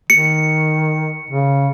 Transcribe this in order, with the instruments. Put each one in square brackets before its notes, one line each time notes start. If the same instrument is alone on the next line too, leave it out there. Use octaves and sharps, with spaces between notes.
[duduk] D#3 [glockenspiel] C#7
[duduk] C#3